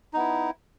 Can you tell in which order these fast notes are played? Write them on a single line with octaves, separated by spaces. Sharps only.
D#4 B3 E4